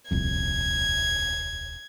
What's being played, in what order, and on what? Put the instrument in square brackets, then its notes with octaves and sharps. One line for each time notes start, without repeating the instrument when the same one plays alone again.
[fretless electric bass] D#1 C2 F2 [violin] G#6